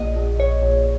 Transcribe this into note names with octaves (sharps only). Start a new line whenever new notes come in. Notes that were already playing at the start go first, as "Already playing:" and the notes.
Already playing: A#1 D#5
A#1
A#1 C#5
A#1